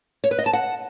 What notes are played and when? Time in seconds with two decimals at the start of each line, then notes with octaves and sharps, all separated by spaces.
0.24 C#5
0.31 B4
0.39 D#5
0.46 A5
0.53 F#5